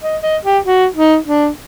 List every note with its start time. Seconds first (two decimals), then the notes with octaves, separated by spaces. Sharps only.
0.03 D#5
0.23 D#5
0.44 G4
0.65 F#4
0.95 D#4
1.26 D4